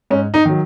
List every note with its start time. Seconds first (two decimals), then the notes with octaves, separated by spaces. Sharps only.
0.11 G#2 C#4
0.34 D#4
0.45 D#3 F#3